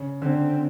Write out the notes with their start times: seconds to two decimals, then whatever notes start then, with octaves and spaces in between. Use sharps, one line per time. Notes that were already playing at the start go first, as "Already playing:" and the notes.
Already playing: C#3
0.22 D3 C4